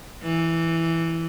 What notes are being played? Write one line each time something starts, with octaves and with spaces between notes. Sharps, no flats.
E3